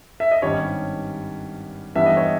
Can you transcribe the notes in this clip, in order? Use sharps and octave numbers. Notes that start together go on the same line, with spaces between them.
E5
D#5
G#1 G2 G3 C#4 C#5
G2 E3 G3 B3 E5
D#5
C#5